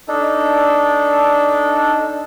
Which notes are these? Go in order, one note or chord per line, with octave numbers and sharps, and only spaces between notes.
D4 D#4 A4